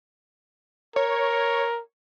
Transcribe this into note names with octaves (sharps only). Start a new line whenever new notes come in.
A#4 C#5